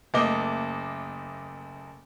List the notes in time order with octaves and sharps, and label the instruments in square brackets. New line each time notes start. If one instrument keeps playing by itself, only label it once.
[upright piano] F#1 A3 A#3 D#5 D6 G7